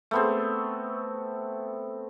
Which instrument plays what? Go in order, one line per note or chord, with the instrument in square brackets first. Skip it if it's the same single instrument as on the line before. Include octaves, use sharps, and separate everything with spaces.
[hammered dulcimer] A3 B3 C4